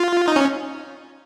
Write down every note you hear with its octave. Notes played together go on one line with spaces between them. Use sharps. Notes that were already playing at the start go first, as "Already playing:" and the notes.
Already playing: F4
D#4
C#4